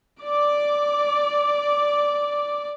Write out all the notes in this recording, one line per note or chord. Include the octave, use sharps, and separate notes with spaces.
D5 D6